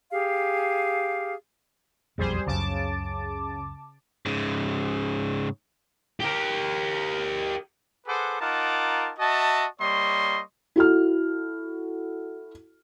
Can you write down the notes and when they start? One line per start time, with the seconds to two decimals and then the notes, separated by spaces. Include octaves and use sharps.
0.11 G4 G#4 F5
2.18 E1 B1 F2 G3 G#4 C5
2.47 C#2 F#2 C#3 A5 D6
4.26 G#2 C#3
6.20 G4 A#4
8.06 G#4 A4 B4 C5 F#5 D6
8.39 D#4 F4 A#4 F#5 A5 D6
9.19 F#4 D#5 E5 A5
9.80 G3 A#3 C#5 D#5 C6 C#6
10.76 E4 F#4 A4 F6